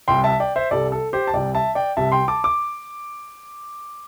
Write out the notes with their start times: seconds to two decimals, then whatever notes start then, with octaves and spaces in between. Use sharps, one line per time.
0.08 C2 C3 G3 G5 C6
0.24 E5 A5
0.40 D5 G5
0.56 C5 E5
0.71 C2 C3 G3 A4 D5
0.92 A4
1.13 G4 C5
1.27 A5
1.34 C2 C3 G3 D5 G5
1.55 E5 A5
1.75 D5 G5
1.97 C2 C3 G3 E5 A5
2.12 G5 C6
2.28 A5 D6
2.44 D6